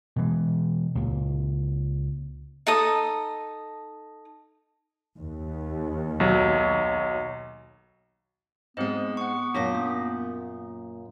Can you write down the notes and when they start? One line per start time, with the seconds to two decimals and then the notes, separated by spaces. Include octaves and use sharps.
0.16 B2 E3 G#3
0.95 C#2 A#2
2.67 D#4 A4 D#6
5.17 D#2
6.20 B1 F#3
8.77 G#2 G#3 B3 C4 C5 D#5
9.17 F#5 C#6
9.54 F#2 A#2 D4 D6 A#6
9.75 A#3